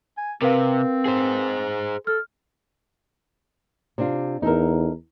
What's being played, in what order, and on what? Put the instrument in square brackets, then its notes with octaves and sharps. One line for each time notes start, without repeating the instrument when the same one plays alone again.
[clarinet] G#5
[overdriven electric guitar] C3 [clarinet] C4 [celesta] A#4 B4 F5
[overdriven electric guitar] G#4 C5
[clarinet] A4 [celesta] F6
[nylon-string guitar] C3 D4 F4
[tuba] E2 [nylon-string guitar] D#4 A4 A#4